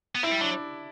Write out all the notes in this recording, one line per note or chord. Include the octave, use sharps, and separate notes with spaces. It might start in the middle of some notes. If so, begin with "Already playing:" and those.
B3
C4 E4
G3
F#3 D4